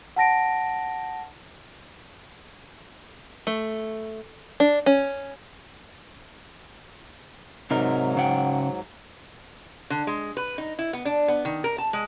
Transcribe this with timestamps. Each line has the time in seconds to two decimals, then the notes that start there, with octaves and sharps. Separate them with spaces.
0.16 F#5 A5 A#6 D7
3.47 A3
4.60 D4
4.86 C#4
7.71 G#2 C3 F#3 D#4 A#4
8.17 C#3 F#5 G5
9.90 D3
10.07 G#3
10.37 B4
10.58 D#4
10.79 E4
10.93 B3
11.05 D4
11.28 B3
11.45 D#3
11.64 A#4
11.78 A5
11.93 G#3